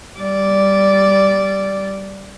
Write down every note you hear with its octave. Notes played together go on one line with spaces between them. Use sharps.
G3 D5